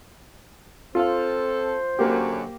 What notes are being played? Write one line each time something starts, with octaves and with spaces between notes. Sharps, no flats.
C4 F4 A4 C5 F5
F#2 D3 F#3 A#3 G4